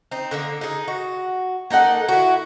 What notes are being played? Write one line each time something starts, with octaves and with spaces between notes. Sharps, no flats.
C4 D#4
D3 D#3 A#3
D#4 G#4
F#4
A#3 D#4 A4 F#5
E4 F#4